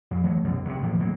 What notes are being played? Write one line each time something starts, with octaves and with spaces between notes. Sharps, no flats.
F2
E3 F#3 A3
C2 F#2 B2
C2 C3
A2 E3 F3 A#3
D#2 A2 F#3 A#3